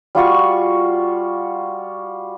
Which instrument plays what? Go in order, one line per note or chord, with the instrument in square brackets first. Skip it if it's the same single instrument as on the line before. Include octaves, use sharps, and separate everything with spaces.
[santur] G3 F4 F#4 C#6